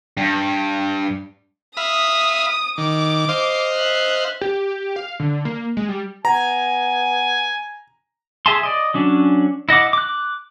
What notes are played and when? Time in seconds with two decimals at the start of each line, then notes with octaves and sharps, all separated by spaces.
0.17 G2
1.77 E5 F5 B5 D#6
2.78 D#3 D6
3.29 C5 D#5 F5
3.75 E5 F#6
4.41 G4
4.96 F5
5.20 D3
5.45 A#3
5.77 G#3
5.89 G3
6.25 B3 G#5 A#5
8.46 G#4 E5 G#5 A5 C6
8.63 D5 D#5
8.94 F#3 C#4 D4
9.69 E4 D#5 F#5 D6
9.93 D6 F#6